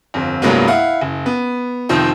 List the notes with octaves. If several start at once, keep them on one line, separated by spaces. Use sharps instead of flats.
G1 F2
C2 G2 F#3 G#3 A#3 B3
E4 F5 F#5
F#1
B3
F1 D#3 F3 C4